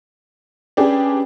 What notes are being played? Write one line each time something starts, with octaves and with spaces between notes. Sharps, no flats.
C#4 D4 G4 G#4 B4